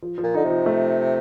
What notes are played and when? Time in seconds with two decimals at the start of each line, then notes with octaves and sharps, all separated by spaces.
0.03 F3
0.18 F3
0.23 A#2
0.34 D3 D#4
0.45 C3
0.50 F3
0.66 A3